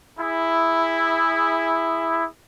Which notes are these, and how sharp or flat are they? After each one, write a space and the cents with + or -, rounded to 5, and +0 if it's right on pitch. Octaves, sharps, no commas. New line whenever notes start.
E4 +0 G#4 -20